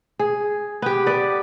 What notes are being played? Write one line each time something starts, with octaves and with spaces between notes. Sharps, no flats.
G#4
B3 G4
B3 D5